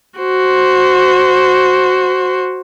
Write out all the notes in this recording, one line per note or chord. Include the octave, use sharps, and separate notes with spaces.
F#4 C5